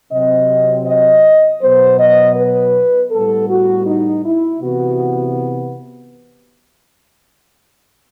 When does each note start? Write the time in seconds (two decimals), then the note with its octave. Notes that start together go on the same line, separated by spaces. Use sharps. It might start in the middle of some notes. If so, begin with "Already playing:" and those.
0.12 C3 F#3 C4 D#5
0.86 D#5
1.62 B2 F#3 B3 C5
1.99 D#5
2.36 B4
3.11 A2 G3 B3 A4
3.48 F#4
3.86 D#4
4.24 E4
4.61 C3 E3 B3 F#4